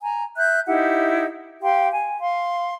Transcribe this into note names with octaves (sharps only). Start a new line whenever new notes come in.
G#5 A#5
E5 F#6 G6
D#4 E4 G4 F#5
G4 F5 G5 C6
G#5
F5 C6